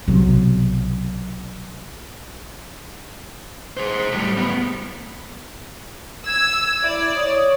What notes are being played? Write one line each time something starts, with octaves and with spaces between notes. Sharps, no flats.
B1 C3 F#3
G#4 C5
A2 G3
A2 B3
E6 G#6
E4 D5
C#5 D#6